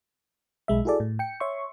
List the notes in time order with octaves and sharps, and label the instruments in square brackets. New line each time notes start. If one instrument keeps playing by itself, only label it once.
[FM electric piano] B1 G#3 E5
E4 F#4 G#4 A4 D5
A2
G5 C#7
C#5 E5 C6 C#6